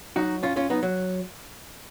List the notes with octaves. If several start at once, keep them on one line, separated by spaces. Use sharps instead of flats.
F#3 D#4 F#4
G#2 C#4 F4
C#4 F4
F#3 B3 D#4
F#3